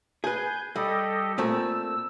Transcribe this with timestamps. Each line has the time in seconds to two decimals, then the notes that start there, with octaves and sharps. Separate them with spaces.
0.24 G#4 B4 G#5 G6
0.76 G3 G4 A4 D#5
1.38 A#2 A3 C4 E6